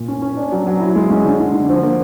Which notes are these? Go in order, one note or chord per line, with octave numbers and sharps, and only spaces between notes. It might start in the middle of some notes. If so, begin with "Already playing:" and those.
Already playing: A#2
C#4
C#4
D4
F#3
F#3
E4
G#3
C#4
D3
D3
D3
F3
A#3